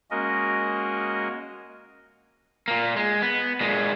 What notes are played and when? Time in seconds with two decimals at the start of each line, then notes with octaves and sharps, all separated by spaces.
0.11 G#3 A#3 C#4 F#4 A#4 D#5
2.68 A#2 A#3
2.96 G#3
3.22 B3
3.61 A#2 G#3